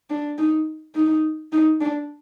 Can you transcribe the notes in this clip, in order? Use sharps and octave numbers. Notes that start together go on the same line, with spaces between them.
D4
D#4
D#4
D#4
D4